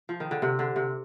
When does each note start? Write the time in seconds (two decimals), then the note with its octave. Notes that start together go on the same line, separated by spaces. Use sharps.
0.09 F3
0.20 D#3
0.31 D3
0.42 C3
0.59 D3
0.76 C3